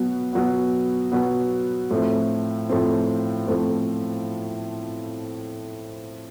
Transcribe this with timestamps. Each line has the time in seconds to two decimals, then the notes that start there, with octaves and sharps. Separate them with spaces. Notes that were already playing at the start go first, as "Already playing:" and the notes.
Already playing: B2 F#3 B3
0.33 B2 F#3 B3
1.12 B2 F#3 B3
1.91 A2 F3 A3 C4
2.69 A2 F3 A3 C4
3.48 A2 F3 A3 C4